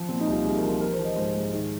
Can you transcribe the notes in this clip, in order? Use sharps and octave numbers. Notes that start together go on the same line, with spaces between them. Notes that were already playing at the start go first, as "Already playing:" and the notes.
Already playing: F3
A#2 C4
D#4
C2
F4
C2 G#4
A#4
F3
F4
F3 A#4
C5
F3
D#5
G#2 C5
G#2
D#3